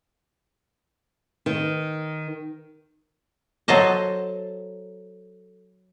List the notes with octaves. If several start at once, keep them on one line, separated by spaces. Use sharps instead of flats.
D#3
F#3 A4 C5 D#5 A5